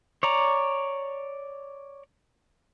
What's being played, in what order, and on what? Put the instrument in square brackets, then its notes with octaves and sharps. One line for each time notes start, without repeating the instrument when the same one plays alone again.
[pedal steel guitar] C#5 D5 A#5